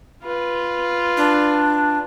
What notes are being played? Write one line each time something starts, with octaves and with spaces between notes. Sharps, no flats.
F4 B4
D4